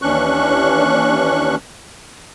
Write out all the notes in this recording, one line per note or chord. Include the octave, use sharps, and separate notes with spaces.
D#2 E3 C#4 D4 C#6 F#6